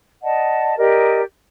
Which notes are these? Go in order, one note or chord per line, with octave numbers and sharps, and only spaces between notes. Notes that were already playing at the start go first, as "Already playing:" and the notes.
D5 D#5 F#5 A5
G4 A#4 D5 D#5